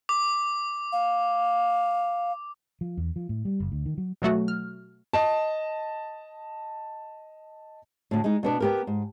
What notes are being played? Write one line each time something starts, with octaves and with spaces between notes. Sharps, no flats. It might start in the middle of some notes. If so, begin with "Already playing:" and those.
D6
F5
F3
E2
F3
A2
G3
F#1
D2
D#3
F#3
B2 F#3 A3 F#4
F6
D#5 A5
D2 A2
G#3 D#4
B2 B3 D4
B3 G4 A#4
G#2